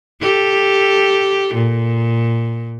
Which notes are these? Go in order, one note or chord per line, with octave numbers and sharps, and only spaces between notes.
G4 A4
A#2